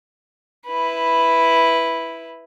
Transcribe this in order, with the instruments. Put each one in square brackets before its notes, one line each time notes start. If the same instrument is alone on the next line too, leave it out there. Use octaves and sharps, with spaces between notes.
[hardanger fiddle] E4 B4